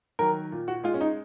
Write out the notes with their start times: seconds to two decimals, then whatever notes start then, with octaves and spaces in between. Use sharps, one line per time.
0.19 D#3 F#3 A#4
0.52 A#2
0.68 F#4
0.84 G#3 F4
0.94 C#4
1.01 D#4